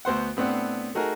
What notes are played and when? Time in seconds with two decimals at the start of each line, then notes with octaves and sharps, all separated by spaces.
0.05 D2 B3 C5 F#5
0.37 A2 B3 C4 D4 F#5
0.95 A3 D#4 F#4 G#4 A#4